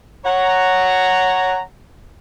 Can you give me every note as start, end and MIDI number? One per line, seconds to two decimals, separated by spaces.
0.24 1.60 73
0.24 1.60 78
0.24 1.60 82